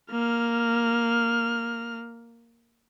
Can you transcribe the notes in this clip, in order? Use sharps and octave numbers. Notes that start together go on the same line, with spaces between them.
A#3 F6